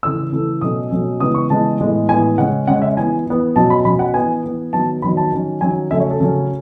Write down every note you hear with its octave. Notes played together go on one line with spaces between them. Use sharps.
C#3 E3 A3 E6
C#3 E3 A3
B2 F#3 A3 C#4 D#6
B2 F#3 A3 C#4
C#3 E3 G#3 B3 D#6
C#6
C#3 E3 G#3 B3 A5
A2 E3 G#3 B3
A2 E3 G#3 B3 G#5
C#3 G#3 C#4 F#5
C#3 G#3 C#4 F#5
E5
E3 B3 G#5
E3 B3
B2 F#3 C#4 A5
B5
B2 F#3 C#4 B5
F#5
E3 B3 G#5
E3 B3
D#3 F#3 B3 A5
D#3 F#3 B3 B5
A5
D#3 F#3 C#4
D#3 F#3 C#4 G#5
C#3 F#3 A3 C#4 E5
C#5
A4
C#3 F#3 A3 C#4